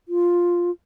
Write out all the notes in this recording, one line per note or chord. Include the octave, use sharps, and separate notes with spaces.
F4